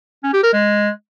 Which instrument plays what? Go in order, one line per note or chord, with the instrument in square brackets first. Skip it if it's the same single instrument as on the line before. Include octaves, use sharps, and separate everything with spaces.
[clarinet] C#4
G4
A#4
G#3